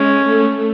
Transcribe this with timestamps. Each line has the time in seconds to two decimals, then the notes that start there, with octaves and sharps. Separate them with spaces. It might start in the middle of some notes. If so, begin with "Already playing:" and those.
Already playing: G#3 C#4
0.27 A3